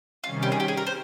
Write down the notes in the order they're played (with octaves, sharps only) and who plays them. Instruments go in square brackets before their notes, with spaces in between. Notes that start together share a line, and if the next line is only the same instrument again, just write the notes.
[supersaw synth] C3 D#3 G3 C#4 [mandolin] F4
[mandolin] G4
G#4
G4
G#4
A#4
C5